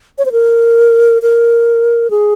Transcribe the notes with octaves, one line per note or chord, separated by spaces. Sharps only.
C#5
C5
A#4
A#4
G#4